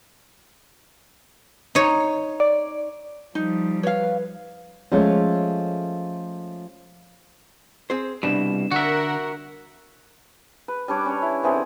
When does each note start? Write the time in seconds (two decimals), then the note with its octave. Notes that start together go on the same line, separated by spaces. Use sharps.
1.75 D#4 C#5
2.40 D5
3.35 F3 G3 D#4
3.83 B4 C#5 F5
4.92 F3 G#3 A3 C#4 F4
7.90 C4 G#4 C5
8.23 C2 G#2 B2 G3 D4 E7
8.71 D3 F#4 A#4 E5 F#5
10.68 B4
10.88 G3 D4 C#5 D6
11.06 C#4 C#5
11.22 E4
11.43 D3 E3 C4 G#4